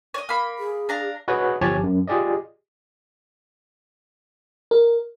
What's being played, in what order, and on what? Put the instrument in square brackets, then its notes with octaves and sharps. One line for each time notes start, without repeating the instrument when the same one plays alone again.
[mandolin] C#5 D#5
A#3 B5
[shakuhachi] G#4
[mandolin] D4 F5 A#5
[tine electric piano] F#4 G#4 B4 C#5 D#5 F#5
G1 F3 G4 C#5 G#5 A5
F#2
F4 G4 G#4 D5 D#5
[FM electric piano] A#4